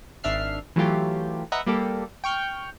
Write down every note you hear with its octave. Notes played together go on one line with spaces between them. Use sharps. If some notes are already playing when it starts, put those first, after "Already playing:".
G#1 D4 E5 F6 C7
E3 F#3 A3 F4 G4
B4 D#5 E5 F#5 A#5
G3 A#3 G4 A4
G5 C#6 F6 G6